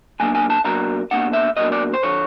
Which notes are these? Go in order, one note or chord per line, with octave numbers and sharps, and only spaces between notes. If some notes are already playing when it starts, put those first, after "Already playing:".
B2 F#3 A#3 D4 G#5
G#5
A5
B2 F#3 A#3 D4 A#5
B2 F#3 A#3 D4 F#5
E5
B2 F#3 A#3 D4 D#5
D5
C5
D3 F3 C#5